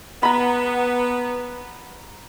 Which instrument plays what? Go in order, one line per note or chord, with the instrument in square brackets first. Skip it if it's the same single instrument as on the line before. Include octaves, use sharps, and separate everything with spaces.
[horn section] B3 [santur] A#5 B5